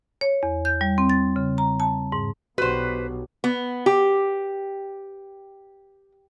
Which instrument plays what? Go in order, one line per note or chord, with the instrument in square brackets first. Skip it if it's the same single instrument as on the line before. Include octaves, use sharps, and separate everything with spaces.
[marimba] C#5
E2
G6
G3
C4
A6
C#3
A#5
A5
G#2
[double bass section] B1 B2 [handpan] D4 F#4 G4 [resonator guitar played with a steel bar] B4 C5
[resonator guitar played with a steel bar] B3
G4